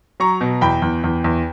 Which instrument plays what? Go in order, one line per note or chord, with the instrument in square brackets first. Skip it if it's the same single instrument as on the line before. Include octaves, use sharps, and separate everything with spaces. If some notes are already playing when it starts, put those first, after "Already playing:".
[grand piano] F#3 A#5 C#6
B2
E2 G5 B5
E2
E2
E2